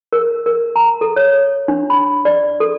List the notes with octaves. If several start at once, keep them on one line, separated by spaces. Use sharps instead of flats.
A#4
A#4
A#5
A4
C#5
D4
B5
D5
A4